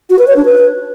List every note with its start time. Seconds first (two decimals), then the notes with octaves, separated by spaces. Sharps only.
0.10 F#4
0.19 B4
0.28 C#5
0.36 D4
0.45 B4